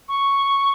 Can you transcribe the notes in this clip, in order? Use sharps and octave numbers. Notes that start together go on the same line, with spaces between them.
C#6